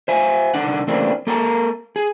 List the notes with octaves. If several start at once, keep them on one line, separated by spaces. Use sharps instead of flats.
C5 E5 G#5
C2 D3 D#3 D4 F#5
C#3 E3 A3 A#3 C4 D4
A#3 A4 A#4 G#5 A#5
G#4